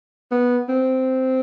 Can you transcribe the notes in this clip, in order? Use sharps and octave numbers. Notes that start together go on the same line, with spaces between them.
B3
C4